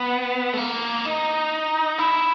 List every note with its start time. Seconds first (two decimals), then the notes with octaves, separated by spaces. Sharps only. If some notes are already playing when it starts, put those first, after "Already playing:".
Already playing: B3
0.53 A3
0.57 A#3
1.05 D#4
1.98 E4